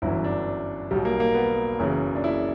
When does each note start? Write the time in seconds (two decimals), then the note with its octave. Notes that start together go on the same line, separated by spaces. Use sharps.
0.02 G1 F#2 E3 E4
0.24 D4
0.91 B1 B2 G3
1.05 A#3
1.20 A#3
1.35 B3
1.79 F#1 F#2 C#3 E3
2.15 D4
2.24 E4